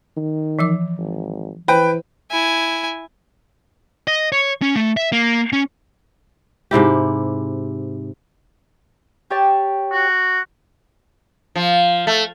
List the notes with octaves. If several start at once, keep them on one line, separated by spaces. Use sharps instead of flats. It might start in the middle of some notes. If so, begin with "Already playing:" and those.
D#3
E3 F3 D6
G#1
E3 B4 C5 G5
E4 G#5
D#5
C#5
C#4
A3
E5
A#3
C#4
G#2 C3 E4 G4
G4 C#5 A5
F#4
F3
A3